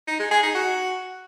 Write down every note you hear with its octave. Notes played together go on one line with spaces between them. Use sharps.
D#4
G#3
G#4
D#4
F#4